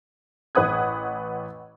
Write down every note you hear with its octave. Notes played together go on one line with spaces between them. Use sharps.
A1 B4 F#5 D#6 G#6